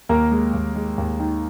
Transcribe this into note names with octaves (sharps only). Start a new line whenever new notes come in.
D#2 A#3 A#4
G#3
D#2
G#3
D#2
D#3